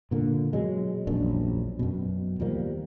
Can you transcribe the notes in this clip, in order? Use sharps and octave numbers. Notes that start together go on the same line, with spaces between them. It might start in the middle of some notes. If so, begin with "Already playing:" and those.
A#2 D3 A#3
B2 F#3 G#3
E1 A#1 F#2 D4
F#2 B2
D#2 F3 G3 A#3